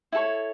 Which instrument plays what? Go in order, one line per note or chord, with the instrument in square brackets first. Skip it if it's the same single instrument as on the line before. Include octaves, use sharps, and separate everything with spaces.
[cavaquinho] E4 A4 C#5